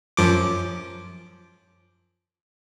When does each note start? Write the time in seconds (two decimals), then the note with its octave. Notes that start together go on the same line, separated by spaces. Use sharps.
0.17 F#2 F3 D6